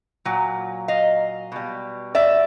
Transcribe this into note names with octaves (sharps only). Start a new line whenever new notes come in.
A#2 F#3
D#5 F5
B2 G3
D5 E5